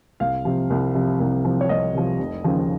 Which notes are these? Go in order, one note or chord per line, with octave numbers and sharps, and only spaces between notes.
C2 F5
C3 F3
C2
C3 F3
C2
C3 F3
C#5
C2 D#5
C3 F3
F1
D#2 C#3 F3